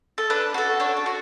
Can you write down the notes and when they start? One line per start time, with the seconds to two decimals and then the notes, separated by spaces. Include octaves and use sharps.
0.18 A4
0.30 D4 B4
0.54 F#4 A4
0.80 D4 C#5
0.97 A4
1.06 F#4